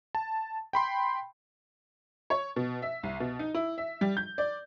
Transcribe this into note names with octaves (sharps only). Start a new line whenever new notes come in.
A5
G5 B5 C6
C#5
B2
E5
C2
B2
D#4
E4
E5
G3
G6
D5